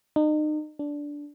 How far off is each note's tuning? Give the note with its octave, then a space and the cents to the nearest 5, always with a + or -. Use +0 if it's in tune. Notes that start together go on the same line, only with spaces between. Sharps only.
D#4 -35
D4 -10